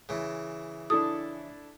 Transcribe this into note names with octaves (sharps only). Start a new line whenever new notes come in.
C#3 E3
D4 E4 A4 D#6